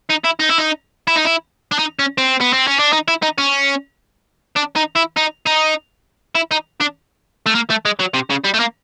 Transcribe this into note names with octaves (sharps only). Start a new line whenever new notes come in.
D#4
E4
D#4
E4
D#4
E4
D#4
E4
D4
D#4
C#4
C4
B3
C4
C#4
D4
D#4
E4
D#4
C#4
D4
D#4
E4
D#4
D#4
E4
D#4
D4
A3
A#3
A3
G#3
F#3
C3
C#3
G3
A3
A#3